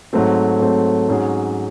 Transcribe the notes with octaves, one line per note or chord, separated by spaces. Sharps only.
G#2 F#3 A3 C4
G#2 F#3 A3 C4
G#2 F#3 C#4 G#4